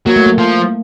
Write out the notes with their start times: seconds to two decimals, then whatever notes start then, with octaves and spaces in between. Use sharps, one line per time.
0.06 F#3 A#3
0.16 A3
0.26 A#3
0.38 F3